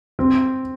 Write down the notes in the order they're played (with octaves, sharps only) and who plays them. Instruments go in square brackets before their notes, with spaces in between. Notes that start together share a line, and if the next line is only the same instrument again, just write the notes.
[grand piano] C4